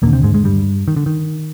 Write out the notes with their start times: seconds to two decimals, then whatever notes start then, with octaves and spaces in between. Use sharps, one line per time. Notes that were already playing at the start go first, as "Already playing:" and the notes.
0.02 D#2 A#2 D3 A#3
0.13 C3 C4
0.23 G#2 G#3
0.34 G#2 G#3
0.44 G2 G3
0.88 D#3
0.96 D3
1.06 D#3